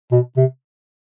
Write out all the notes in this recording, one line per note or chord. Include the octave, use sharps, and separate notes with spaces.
B2
C3